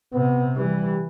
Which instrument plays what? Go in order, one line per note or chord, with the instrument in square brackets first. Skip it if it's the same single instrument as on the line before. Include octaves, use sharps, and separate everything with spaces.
[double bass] C3 [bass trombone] B3
[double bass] E3 [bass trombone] G3